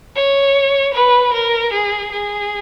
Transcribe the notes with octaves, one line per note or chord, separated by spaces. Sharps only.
C#5
B4
A#4
G#4
G#4